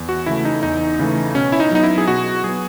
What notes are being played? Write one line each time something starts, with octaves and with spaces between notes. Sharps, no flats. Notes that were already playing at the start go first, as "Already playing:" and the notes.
Already playing: E2
F#4
C#3 E3 A3 E4
D#4
E2 D#4
C#3 E3 A3
B2 C#4
E4
D#4
F#3 B3 D#4
E4
G#4
B2 F#4
F#3 B3 G#4